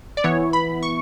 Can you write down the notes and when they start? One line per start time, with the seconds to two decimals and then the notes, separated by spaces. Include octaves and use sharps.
0.17 D5
0.24 E3 B3 E4 C#5
0.53 B5
0.83 C#6